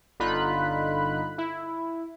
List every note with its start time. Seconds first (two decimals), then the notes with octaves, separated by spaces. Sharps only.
0.20 G1 D3 D#4 F4 B5 F#6
1.38 E4